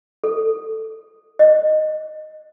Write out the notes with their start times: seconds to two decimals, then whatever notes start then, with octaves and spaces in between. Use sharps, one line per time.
0.24 A4
1.39 D#5